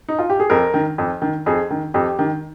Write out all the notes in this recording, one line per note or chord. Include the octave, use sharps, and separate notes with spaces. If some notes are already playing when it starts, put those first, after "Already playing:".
D#4
F4
G4
G#4
F2 A#4
D#3
F2
D#3
F2 G#4
D#3
F2 G4
D#3